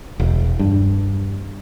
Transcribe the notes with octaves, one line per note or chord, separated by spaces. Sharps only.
E1
G2